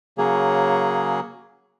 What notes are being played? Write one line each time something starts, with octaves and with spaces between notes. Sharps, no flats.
C#3 F#3 A#3 G#4